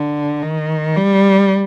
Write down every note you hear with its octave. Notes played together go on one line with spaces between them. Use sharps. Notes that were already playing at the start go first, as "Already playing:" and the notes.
Already playing: D3
D#3
G3